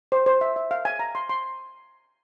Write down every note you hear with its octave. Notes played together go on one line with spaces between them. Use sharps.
C5
C5
E5
E5
F5
G#5
A#5
C6
C6